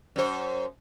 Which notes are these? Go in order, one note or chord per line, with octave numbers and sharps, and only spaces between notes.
F#2 C5